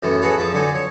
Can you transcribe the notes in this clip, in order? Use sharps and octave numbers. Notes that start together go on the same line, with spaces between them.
F#2 A2 E3 A3 B3
F#4 G#4 A4 B4 C#5
F2 F3 E5 A5
D3 F#3 D#4 A4 G#5
C#5